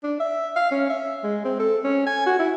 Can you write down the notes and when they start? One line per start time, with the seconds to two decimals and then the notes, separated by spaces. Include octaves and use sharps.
0.04 D4
0.20 E5
0.56 F5
0.71 C#4
0.90 E5
1.23 G#3
1.45 C4
1.59 A4
1.84 C#4
2.07 G#5
2.27 F#4
2.39 E4